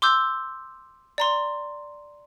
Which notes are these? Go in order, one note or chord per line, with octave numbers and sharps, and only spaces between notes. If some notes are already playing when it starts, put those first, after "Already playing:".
C6 D6 E6 G6
D5 A#5 C6